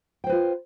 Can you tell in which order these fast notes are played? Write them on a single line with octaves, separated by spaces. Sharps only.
G5 C5 B4 F4